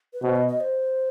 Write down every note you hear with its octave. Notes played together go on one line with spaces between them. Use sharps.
B4
B2 C5
D#5
D#5
C5